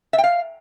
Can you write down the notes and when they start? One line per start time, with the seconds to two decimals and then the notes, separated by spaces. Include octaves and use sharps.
0.13 E5
0.18 G5
0.24 F5